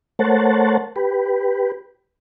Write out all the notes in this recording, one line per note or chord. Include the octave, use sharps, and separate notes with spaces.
A3 A#4 C5 C#5 F#5 A5
G4 B4